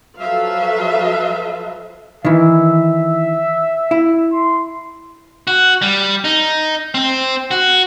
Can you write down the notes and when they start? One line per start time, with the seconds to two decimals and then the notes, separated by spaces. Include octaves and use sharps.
0.19 F3 F#3 A4 B4 E5 F5
2.25 D#3 E3 E5
3.91 E4
4.33 C6
5.48 F#4
5.82 G3
6.24 D#4
6.95 C4
7.51 F#4